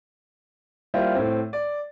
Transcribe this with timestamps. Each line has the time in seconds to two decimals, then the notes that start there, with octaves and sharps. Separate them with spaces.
0.94 G3 A#3 E4 F4 C5
1.15 A2 C4
1.53 D5